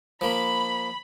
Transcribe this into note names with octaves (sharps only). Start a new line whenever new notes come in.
F3 A#3 B5